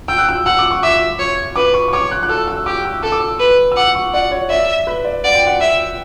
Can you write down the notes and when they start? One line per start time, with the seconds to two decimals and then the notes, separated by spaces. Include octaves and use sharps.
0.08 G5 E6
0.18 F#6
0.29 E6
0.46 F#5 E6
0.59 D6
0.71 C#6
0.83 E5 D6
1.19 C#5
1.56 B4 D6
1.74 C#6
1.88 C#6
1.93 C#5 D6
2.11 F#6
2.23 F#6
2.29 A4 E6
2.48 E6
2.66 G4 D6
2.85 E6
3.03 A4 E6
3.12 D6
3.20 E6
3.39 B4
3.72 E6
3.76 F#5 D6
3.95 C#6
4.14 D5 F#5
4.31 C#5
4.50 D5 E5
4.87 B4
5.05 D5
5.24 D5 F#5
5.35 G5
5.47 F#5
5.61 E5